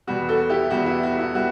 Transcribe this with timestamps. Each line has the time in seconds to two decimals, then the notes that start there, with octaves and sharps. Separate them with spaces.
0.07 E2 B2 G3 B3 F#4
0.29 F#4 A4
0.50 E4 G4
0.71 E2 B2 G3 B3 F#4
0.86 E4
1.03 F#4
1.19 E4
1.34 B2 G3 B3 F#4